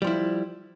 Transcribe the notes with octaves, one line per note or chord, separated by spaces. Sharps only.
F3 G3 E4